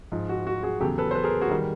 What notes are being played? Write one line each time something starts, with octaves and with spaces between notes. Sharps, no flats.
G#2 F3
F#4
F#4
F#4 G#4
E2 C#3 F#3 G4 A4
A4 B4
C5
A4 B4
G#4 A#4
F#4 G#4
D#3 G3